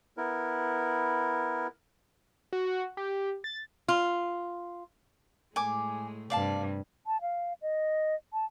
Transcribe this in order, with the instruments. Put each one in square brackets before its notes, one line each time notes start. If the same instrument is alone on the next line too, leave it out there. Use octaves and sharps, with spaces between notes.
[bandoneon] B3 E4 A#4
[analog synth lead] F#4
G4
A6
[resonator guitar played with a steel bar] F4
[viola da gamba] A2 G#3 A3 [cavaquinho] G#5 D6
[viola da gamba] G2 C3 [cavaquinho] D5 F5 A5
[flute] A5
F5
D#5
A5